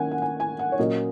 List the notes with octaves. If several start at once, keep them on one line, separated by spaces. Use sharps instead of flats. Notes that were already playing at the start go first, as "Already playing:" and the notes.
Already playing: D#3 A#3 C#4 F#5 G#5
F#5
G#5
G#5
F#5
C#5
A#2 F#3 A#3 C#4 D#5